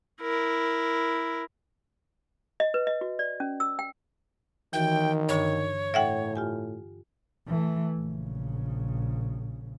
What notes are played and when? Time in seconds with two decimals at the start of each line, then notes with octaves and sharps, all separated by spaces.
0.21 E4 A#4
2.60 D#5
2.74 B4
2.87 D#5
3.01 F#4
3.19 D5
3.40 C#4
3.60 E6
3.79 G5
4.73 D#3 E3 F#4 G5
5.28 G2 D3 D4 C#5
5.94 A2 A4 E5 F#5 G5
6.36 F4 G4 G#5
7.47 E3 A3
7.97 A#1 C#3